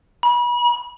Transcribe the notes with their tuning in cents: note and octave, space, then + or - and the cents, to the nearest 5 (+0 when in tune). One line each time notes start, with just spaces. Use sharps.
B5 -35